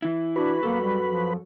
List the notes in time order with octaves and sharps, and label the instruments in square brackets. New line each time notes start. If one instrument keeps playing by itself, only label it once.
[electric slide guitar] E3 E4
[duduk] D4 [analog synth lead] F#4 [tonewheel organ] B4
[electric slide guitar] F#2 C3 A4 [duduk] A#3
[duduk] G3
F3